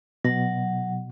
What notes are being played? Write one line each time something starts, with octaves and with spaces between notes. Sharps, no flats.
B2 F#3 F#5